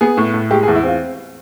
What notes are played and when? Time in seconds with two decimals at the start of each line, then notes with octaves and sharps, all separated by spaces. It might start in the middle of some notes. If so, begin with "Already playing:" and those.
0.01 B3 G#4
0.17 A2
0.34 A2
0.51 G#3 G4
0.63 G#4
0.68 E2
0.75 E4
0.83 C4 F4